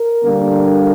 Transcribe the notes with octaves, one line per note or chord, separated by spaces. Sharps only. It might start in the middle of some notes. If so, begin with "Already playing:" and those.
Already playing: A#4
D3 G3 A#3